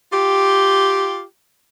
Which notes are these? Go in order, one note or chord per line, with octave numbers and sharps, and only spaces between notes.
F4 G4